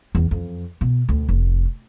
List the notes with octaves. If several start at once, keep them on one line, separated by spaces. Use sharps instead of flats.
E2
F2
B2
D2
F1